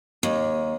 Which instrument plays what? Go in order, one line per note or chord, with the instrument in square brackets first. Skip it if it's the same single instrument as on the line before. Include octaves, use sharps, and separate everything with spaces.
[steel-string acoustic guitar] D#2